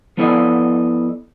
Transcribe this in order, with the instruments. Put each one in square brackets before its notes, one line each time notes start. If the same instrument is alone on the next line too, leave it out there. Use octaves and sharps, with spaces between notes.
[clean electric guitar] F3 B3 E4 A4 D5 D#5